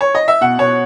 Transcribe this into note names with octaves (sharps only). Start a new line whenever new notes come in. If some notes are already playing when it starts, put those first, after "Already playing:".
C#5
D#5
E5
B2 F#5
B2 C#5